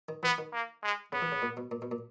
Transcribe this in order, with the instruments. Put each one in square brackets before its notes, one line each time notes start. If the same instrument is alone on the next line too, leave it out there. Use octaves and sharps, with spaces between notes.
[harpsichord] D#3
[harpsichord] E3 [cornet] B3
[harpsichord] D#3
[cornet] A#3
G#3
[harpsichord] C#3 [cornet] B3
[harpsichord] E3
C#3
A#2
B2
A#2
B2
A#2